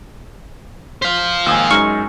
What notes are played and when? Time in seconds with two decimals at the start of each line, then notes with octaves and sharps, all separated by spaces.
1.02 C5 F5 B6
1.46 D#2 G#2 G#5 D#6 E6
1.71 F#2 G#3 D#4 C#6 F6 C#7